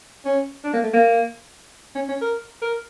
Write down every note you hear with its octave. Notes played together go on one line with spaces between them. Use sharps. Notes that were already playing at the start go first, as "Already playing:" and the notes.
C#4
D4
A#3
A3
A#3
C#4
C#4
A#4
A#4